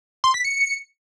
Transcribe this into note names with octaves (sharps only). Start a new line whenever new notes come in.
C6
B6
C#7